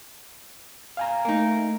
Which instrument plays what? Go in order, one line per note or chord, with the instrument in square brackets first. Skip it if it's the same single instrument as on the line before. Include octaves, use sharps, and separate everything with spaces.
[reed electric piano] F5 G#5 A#5
[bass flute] A3 [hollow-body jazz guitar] A#3 D#4